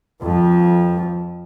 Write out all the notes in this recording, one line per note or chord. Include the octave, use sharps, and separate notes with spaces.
F2 F3